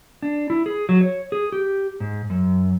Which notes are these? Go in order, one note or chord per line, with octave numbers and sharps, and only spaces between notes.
D4
E4
G#4
F#3
C#5
G#4
G4
G#2
F#2